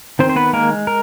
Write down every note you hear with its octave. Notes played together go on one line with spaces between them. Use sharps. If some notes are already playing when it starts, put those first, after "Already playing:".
D#3 C4 C5
C5
B3 B4
G#3 A#3 A#4
A#4